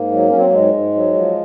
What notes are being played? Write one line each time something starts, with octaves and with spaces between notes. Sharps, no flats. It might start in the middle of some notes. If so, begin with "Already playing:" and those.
Already playing: G#2 A#3
F#3
F#3 C#4
C4
A#3
G#2 G#3
G#2
F#3
F3